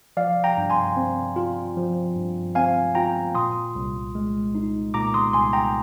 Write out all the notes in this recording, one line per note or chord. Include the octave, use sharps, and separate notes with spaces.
F3 D5 F5
G5 A#5
G2
G#5 C6
C4
F4
F3
G2
C4 F5 G#5
F4 G5 A#5
A#2 C6 D#6
C2
G#3
D#4
A#2 A#5 D6
C6 D#6
C2 G#5 C6
G5 A#5